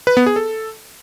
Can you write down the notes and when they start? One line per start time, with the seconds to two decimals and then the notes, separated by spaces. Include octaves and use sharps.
0.07 B4
0.17 B3
0.26 G#4
0.36 A4